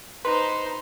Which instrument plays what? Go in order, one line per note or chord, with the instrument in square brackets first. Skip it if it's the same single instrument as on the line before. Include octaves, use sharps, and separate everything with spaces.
[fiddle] D#4 C5 [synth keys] B4 [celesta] C6